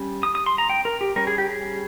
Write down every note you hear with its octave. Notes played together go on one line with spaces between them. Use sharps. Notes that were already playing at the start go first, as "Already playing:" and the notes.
Already playing: G3 C#4
D#6
D#6
C6
A#5
G5
A#4
G4
G3 C#4 A#4
G#4
G4
G#4